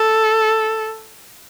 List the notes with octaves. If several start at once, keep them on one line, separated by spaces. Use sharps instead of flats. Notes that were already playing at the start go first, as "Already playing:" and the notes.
Already playing: A4